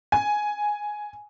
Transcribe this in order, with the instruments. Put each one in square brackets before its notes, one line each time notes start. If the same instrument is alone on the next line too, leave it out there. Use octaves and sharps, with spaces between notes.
[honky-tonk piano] G#5